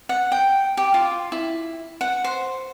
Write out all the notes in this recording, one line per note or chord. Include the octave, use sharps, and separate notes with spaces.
F#5
G5
G4
F4
E4
F#5
C5